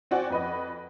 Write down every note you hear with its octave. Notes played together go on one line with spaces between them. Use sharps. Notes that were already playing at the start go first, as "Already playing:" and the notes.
C4 F#4 D5 G5 G#5
F2 B4 D#5